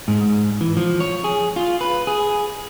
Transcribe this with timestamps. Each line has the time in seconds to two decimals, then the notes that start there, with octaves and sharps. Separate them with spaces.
0.08 G#2
0.61 E3
0.77 F3
1.00 C#5
1.24 G#4
1.56 F4
1.81 B4
2.07 G#4